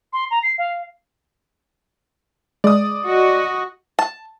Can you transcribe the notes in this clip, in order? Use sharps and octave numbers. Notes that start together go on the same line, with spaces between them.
C6
A#5
C7
F5
G#3 D5 D#6
F#4 D#5
A5